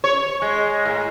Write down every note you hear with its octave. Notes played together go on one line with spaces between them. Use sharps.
C#5
G#3
A2